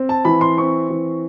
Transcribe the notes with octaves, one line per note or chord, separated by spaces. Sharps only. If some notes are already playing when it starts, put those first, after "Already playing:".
Already playing: C4
A5
E3 B5
C6
C4 C#6
E3